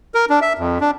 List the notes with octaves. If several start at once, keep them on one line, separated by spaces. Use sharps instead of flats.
A#4
D4
E5
F2
D4